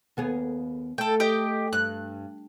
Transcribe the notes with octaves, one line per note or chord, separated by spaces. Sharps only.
D#2 B3 G#4
A3 A4 G5
G4 D#5 G5
G2 F#6